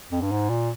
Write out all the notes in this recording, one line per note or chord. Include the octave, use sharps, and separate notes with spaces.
F2
G2
G#2
A#2